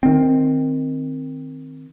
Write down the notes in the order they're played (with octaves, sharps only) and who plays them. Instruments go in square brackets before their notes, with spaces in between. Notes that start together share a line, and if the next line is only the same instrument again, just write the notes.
[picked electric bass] D#3 C4